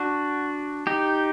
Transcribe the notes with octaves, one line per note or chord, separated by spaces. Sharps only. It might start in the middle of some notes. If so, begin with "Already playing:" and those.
Already playing: D4 F#4
D#4 G4